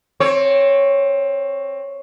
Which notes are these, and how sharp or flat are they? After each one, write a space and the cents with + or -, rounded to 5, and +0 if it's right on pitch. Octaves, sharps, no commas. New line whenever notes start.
C4 +20 C#5 +0